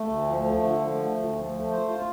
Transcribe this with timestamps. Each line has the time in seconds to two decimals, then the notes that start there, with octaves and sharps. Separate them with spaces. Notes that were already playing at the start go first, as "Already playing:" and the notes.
Already playing: A3
0.08 D2
0.27 F3
0.44 A3
0.63 D3
0.81 F3
0.98 A3
1.16 D2
1.35 F3
1.53 A3
1.71 C5
1.89 F4